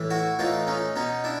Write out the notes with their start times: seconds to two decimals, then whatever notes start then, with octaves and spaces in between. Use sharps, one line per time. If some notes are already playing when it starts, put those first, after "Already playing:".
Already playing: A2 E3
0.10 E4 F#4
0.39 A2 E3 D#4 F4
0.67 C#4 D#4
0.96 B2 C#4 D#4
1.24 D4 E4